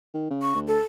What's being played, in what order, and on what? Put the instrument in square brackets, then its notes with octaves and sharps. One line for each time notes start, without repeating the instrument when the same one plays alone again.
[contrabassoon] D#3
C#3
[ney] C#6
[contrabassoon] D2
[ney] A4